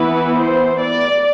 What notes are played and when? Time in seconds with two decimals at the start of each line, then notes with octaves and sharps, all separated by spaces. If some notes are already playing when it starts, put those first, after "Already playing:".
Already playing: E3 B3 E4 B4
0.39 C5
0.82 D5